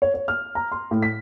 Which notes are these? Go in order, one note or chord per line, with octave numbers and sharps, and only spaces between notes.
C#5
C#5
F6
A#5
C6
A2
B6